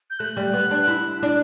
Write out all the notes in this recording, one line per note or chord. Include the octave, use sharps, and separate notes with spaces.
G6
A3 F#6
G3
B3
D4
E4
D4